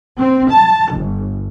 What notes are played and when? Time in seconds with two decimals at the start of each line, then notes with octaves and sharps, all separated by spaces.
0.18 C4
0.50 A5
0.92 G1